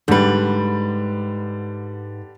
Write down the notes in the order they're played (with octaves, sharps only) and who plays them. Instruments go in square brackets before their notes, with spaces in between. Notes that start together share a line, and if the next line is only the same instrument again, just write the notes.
[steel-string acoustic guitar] G#2 B4 [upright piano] D3 G3